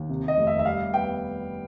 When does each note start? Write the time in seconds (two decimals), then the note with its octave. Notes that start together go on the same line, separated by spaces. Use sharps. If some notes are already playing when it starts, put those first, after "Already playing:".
Already playing: D#2
0.09 C3
0.28 D#5
0.37 F1
0.47 E5
0.59 E5
0.65 G3 F5
0.94 B3 G5